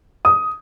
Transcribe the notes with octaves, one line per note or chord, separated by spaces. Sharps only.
D#6